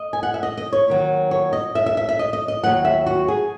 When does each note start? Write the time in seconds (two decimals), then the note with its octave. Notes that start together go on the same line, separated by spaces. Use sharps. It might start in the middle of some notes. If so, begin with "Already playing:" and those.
Already playing: D#5
0.13 G#5
0.23 F#5
0.34 E5
0.43 D#5
0.57 D#5
0.73 C#5
0.88 D#2 D#3 F#3
1.31 C#5
1.53 D#5
1.75 E5
1.86 E5
1.97 E5
2.09 E5
2.19 D#5
2.33 D#5
2.48 D#5
2.63 D#2 C#3 F#3 F#5
2.85 E5
3.06 F#4
3.28 G#4